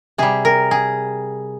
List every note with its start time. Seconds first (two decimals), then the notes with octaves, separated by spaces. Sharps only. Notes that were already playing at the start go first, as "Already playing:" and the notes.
0.18 C3 G3 G#4
0.45 A#4
0.71 G#4